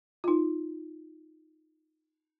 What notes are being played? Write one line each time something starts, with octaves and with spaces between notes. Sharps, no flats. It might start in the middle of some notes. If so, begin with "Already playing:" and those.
D#4 F4